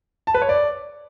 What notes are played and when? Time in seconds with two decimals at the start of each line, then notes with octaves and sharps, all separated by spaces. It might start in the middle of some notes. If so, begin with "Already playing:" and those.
0.27 A5
0.34 B4
0.42 C#5
0.49 D5